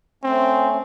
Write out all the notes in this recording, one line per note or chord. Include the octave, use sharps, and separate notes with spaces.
A3 C4 C#4